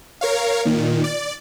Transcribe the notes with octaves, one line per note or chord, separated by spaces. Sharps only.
A#4 C#5 F5
A#2 D#3
D5